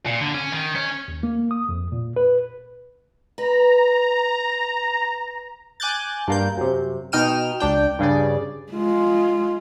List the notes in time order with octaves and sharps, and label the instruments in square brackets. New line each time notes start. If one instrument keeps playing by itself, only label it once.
[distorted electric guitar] A#2
D3
C#4
D#3
C#4
[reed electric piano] D#2
A#3
D#6
F2
A#2
B4
[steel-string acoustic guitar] B4 [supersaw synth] A#5
[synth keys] G#5 D6 F#6 G6 A6
G2 A#3 G6
F#2 C3
B2 D#4 G5 F6 D#7 E7
C#2 D4 G5
G2 C#3 G#4 D5
[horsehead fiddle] G#3 F4